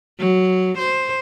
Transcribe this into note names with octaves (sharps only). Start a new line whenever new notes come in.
F#3
C5